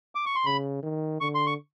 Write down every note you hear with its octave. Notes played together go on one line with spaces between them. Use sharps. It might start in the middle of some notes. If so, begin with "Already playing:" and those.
D6
C#6
C6
C#3 B5
D#3
D3 C#6
C6
C#6